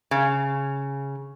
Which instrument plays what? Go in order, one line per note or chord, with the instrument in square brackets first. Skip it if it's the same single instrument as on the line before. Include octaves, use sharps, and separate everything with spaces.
[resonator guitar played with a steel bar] C#3